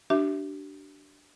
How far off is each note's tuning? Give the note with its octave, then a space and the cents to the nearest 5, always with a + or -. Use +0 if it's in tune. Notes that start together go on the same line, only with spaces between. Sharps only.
D4 +0 G4 -40 E5 +0